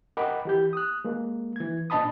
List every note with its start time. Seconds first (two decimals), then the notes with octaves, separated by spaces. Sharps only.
0.17 A#4 D#5 F#5 G5 B5 D6
0.45 E3 G4 G6
0.73 D#6 F#6
1.05 G#3 A#3
1.56 E3 G#6
1.90 A#2 D4 D#5 A5 B5 D#6